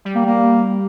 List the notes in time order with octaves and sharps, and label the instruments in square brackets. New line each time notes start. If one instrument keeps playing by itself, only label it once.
[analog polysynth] G3
[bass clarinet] A#3
A#3